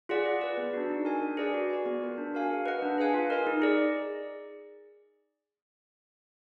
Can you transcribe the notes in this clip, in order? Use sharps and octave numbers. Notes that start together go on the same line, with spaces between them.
F4 G#4 D5 F#5
G#4
B4 D5
B3
D4 F#4
D#4
A#4 D#5 G#5
D4
G#4 B4 D5 G#5
F#4
D5 G#5
B3
F4 A#4
D4
F#4 A#4 F5 G#5
G#4
B4 D#5 F#5
D4
G#4 B4 F5 G#5
F4
A#4 D#5 G#5
D#4
G#4 D5